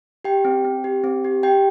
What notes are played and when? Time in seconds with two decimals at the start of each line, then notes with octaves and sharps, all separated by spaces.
0.25 G4 G5
0.45 C4
0.64 C4
0.84 G4
1.04 C4
1.24 G4
1.43 G4 G5